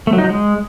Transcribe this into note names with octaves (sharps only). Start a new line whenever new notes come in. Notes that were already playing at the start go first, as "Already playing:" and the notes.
A3
F#3
D#4
F#3
G#3